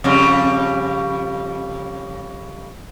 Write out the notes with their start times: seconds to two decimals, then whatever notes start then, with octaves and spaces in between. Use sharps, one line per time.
0.04 F2 C#3 G3